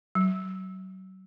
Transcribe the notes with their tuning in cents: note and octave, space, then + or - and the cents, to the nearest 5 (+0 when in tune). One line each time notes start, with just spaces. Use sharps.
F#3 +30